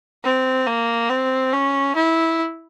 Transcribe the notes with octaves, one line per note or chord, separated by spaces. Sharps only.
C4
A#3
C4
C#4
E4